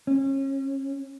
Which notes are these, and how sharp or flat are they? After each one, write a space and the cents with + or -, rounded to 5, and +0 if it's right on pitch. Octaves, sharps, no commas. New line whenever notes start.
C#4 -30